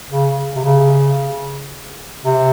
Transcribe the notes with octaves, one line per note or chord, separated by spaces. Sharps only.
C#3
C3
C#3
C3